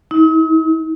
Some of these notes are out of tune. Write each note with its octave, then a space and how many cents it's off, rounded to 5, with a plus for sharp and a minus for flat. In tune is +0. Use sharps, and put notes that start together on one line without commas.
D#4 +45